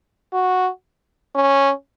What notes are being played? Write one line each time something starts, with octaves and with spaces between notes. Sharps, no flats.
F#4
C#4